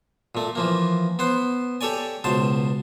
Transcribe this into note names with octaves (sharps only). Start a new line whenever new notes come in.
A#2 A3
E3 F3 A#3
B3 C5 F#5
G4 A4 C#5 D5 G#5
C#2 B2 C5 A5